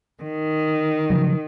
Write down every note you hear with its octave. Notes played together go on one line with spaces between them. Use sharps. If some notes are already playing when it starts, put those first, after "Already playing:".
D#3
C#3 F3 F#3